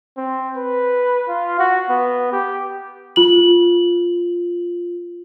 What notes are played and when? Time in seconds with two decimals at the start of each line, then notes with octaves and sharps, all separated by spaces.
0.17 C4
0.56 B4
1.28 F4
1.59 F#4
1.89 B3
2.32 G4
3.16 F4 F#7